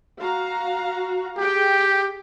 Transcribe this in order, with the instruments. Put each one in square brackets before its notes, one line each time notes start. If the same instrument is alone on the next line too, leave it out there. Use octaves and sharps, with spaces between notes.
[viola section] F#4 F5 A#5
[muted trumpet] G4 [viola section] G#4 G5